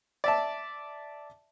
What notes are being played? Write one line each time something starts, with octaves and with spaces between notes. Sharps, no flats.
D5 E5 A5